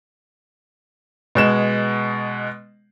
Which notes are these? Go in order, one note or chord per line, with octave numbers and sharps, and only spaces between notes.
B2 G#3 E7